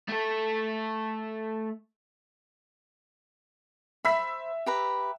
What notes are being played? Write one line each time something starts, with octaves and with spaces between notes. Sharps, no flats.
A3 A4
C5 E5 B5 E6 B6
G4 B4 A#5